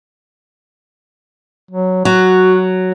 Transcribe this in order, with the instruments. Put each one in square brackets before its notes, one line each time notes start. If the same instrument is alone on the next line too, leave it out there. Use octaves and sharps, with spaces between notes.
[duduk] F#3
[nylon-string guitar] F#3 [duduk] F#4